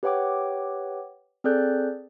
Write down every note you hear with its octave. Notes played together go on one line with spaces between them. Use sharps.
G4 B4 C#5 F#5 G5 D6
C4 G#4 A4 D5 F#6 G6